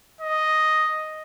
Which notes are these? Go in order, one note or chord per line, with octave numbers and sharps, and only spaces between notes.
D#5